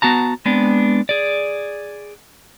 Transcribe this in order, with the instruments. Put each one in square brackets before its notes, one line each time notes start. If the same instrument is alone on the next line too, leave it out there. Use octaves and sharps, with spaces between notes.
[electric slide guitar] B3 F#4 A5 A#5
G#3 B3 C4 D4
G#4 D5